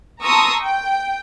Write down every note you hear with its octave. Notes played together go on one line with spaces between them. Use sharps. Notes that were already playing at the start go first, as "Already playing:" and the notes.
A5 A#5 C6 C#6 D#6 E6
G5